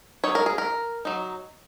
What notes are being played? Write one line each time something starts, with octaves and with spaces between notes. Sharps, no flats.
F#3 D#4 C#5
A#4
G#4
A#4
F#3 D#4